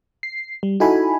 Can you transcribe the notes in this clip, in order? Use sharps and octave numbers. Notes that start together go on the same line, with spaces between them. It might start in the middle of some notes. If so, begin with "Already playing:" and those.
C7
G3
D#4 E4 F#4 A4 G#5 B5